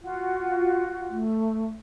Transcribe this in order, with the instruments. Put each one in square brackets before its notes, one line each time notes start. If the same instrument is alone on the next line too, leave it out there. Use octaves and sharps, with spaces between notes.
[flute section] F4 F#4
[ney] A3